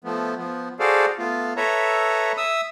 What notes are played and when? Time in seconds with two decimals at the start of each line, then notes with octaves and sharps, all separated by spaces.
0.04 F3 A3 B3
0.37 F3 B3
0.80 F#4 G#4 A4 C5 D5 F5
1.18 A3 B3 F4
1.57 A4 B4 C#5 E5 A#5
2.37 E5 D#6 E6